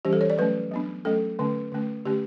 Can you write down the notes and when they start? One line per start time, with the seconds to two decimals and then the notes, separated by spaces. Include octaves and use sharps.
0.05 E3 G3 C#4 G4
0.13 A4
0.21 C#5
0.30 D5
0.38 F#3 A3 C#4 B4
0.71 F#3 B3 D4
1.05 F#3 A3 C#4 A4
1.39 D3 A3 C#4
1.72 D3 A3 C#4
2.05 D3 A3 C#4 G4